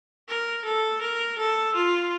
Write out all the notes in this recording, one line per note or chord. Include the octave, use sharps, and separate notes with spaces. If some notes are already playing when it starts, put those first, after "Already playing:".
A#4
A4
A#4
A4
F4